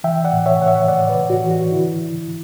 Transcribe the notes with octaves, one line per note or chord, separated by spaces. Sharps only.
E3 E5 G5
D5 F#5
A2
C#5 E5
A2 F#5
C#5 E5
A2 D5 F#5
B4 D5
A2
F#4
E3
F#4
D3 E4